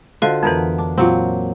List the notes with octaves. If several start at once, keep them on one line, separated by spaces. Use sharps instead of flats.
D3 F4 F#4 C5 D#5 G5
F2 E3 B3 A#4 B4
D4
A#2 F#3 C4 C#5 F#5